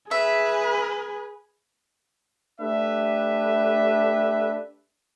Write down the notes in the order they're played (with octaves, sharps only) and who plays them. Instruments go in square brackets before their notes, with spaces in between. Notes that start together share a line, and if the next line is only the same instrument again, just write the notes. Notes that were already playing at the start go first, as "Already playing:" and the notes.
[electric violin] G#4 [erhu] B4 [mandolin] E5
[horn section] A3 D4 G4 B4 E5